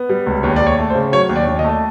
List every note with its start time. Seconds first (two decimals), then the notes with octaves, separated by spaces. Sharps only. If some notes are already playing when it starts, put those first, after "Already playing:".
Already playing: B3
0.09 G3
0.27 C#2
0.43 D#2 C#5
0.56 D#2 D5
0.66 C#5
0.78 A3
0.90 C5
0.95 C#3
1.12 F#3 C#5
1.29 D#2
1.36 D5
1.47 D#2
1.59 D#5
1.64 A3